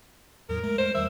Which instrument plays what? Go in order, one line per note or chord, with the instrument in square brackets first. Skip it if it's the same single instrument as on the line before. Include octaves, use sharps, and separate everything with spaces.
[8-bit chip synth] E2 A2 F#3 [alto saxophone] A#4
[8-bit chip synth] G#3 A3
[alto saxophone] C5
[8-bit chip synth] E2 D#3 G3 [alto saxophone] E5